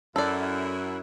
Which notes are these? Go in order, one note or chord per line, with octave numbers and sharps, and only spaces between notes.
F#2 E4 A4 D5